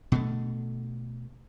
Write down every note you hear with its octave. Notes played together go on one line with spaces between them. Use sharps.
B2 D3 A3